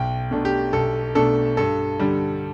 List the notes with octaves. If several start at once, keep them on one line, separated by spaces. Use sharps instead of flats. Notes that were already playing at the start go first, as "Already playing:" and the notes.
Already playing: B1 G5
B2 A3 D4
G4
B1 A4
B2 A3 D4 A4
G2 A4
D3 G3